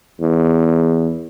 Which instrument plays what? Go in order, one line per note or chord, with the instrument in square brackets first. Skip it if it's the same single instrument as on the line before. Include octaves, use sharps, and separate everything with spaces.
[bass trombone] E2